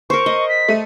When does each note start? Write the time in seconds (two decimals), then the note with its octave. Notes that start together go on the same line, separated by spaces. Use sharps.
0.10 A#4 C5 C#6
0.26 D#5
0.49 B6
0.68 A3 D#7